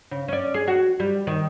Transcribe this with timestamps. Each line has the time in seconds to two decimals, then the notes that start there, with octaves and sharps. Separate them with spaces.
0.11 C#3
0.28 C#4 D5
0.54 G#4
0.67 F#4
1.00 G3
1.27 D#3